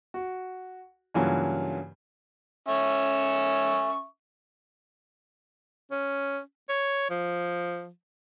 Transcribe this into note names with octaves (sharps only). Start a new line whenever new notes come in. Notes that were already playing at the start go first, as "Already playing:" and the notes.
F#4
G2 C#3 E3 F#3 A#3 F4
C#4 E5 C#6
C#4
C#5
F3